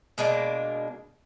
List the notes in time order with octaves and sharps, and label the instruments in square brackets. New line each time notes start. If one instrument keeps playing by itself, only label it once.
[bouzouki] B2 G#3 A#3 D4